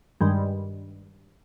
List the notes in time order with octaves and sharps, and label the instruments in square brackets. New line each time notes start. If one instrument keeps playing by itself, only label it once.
[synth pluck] G2 D#3 G3 G#3